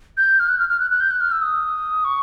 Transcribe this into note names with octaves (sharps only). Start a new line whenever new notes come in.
G6
F6
F#6
F6
F6
F#6
F#6
G6
F#6
F6
E6
D#6
C#6